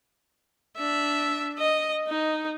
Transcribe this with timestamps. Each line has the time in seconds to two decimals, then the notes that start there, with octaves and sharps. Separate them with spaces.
0.77 D4 E5
1.58 D#5
2.08 D#4